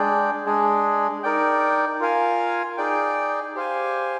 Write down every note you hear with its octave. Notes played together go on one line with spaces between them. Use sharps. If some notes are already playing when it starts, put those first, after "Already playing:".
Already playing: G#3 D4 G#4 D5 G5
G#3 D4 G#4
D#4 A#4 D5 G5
F4 A#4 F5 G#5
D#4 G#4 D5 G5
G4 C5 F5 G#5